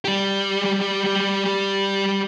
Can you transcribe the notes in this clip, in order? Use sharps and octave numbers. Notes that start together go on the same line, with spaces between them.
G3 G4